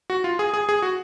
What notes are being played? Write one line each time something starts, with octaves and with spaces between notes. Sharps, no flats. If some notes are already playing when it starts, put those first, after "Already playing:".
F#4
F4
G#4
G#4
G#4
F#4